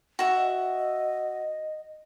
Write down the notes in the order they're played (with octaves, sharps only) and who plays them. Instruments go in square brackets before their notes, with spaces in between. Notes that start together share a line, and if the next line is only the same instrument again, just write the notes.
[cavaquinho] F#4 E5
[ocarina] D#5